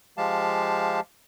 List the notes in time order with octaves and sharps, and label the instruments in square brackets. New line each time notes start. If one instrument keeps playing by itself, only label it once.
[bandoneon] F3 G#3 G4 F5 A5